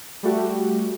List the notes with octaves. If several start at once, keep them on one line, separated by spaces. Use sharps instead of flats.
G3 A3 F#4 G4